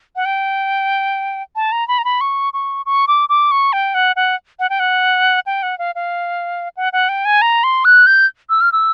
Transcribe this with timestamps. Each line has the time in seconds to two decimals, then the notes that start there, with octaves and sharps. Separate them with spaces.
0.16 F#5
0.25 G5
1.56 A5
1.72 A#5
1.88 B5
1.99 A#5
2.05 B5
2.21 C#6
2.53 C#6
2.86 C#6
3.08 D6
3.29 D6
3.51 C#6
3.73 G5
3.94 F#5
4.16 F#5
4.59 F#5
4.70 G5
4.80 F#5
5.46 G5
5.63 F#5
5.79 F5
5.95 F5
6.77 F#5
6.93 F#5
7.09 G5
7.25 G#5
7.42 A#5
7.64 C6
7.85 F#6
8.07 G6
8.50 E6
8.61 F6
8.72 E6